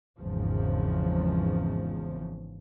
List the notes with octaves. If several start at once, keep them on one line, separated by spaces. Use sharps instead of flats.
G#1 E2 C#3 F3